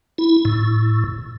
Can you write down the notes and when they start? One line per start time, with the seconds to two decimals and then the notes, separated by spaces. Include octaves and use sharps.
0.18 E4
0.45 A2